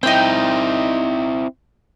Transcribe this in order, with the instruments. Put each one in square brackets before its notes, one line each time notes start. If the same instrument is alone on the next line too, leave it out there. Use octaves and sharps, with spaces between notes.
[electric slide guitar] C4 E4 [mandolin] D#4 G5